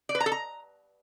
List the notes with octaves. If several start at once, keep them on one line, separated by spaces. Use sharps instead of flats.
D5
B4
A#5
A4
A#5